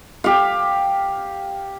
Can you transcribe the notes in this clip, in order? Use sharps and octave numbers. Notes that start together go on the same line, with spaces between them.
G4 F5